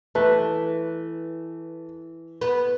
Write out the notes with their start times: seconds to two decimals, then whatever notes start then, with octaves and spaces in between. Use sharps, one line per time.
0.15 E3 A3 B4
2.41 B3 B4